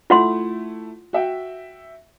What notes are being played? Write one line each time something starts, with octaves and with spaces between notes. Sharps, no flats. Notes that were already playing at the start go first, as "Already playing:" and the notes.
A3 E4 F4 F#5 C6
F#4 E5 G5